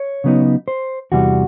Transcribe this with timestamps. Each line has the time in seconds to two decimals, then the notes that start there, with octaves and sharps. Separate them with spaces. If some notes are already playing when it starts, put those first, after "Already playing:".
Already playing: C#5
0.24 C#3 F#3 B3 D#4
0.68 C5
1.12 E2 C3 E3 G3 F#4